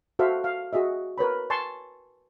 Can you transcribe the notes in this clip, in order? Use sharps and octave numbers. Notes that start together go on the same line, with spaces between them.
F#4 A4 C5 E5 F5
F5
F#4 G#4 D#5 E5
A#4 B4 C#5 B5
G#5 A5 C6 C#6